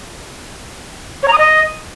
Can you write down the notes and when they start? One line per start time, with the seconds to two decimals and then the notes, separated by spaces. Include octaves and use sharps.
1.23 C#5
1.28 A#5
1.33 D#6
1.38 D#5